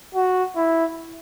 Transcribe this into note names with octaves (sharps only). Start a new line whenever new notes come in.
F#4
E4